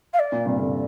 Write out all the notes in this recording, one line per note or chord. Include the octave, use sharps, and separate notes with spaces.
F5
D5
A#2
G2 C3
A#2 D3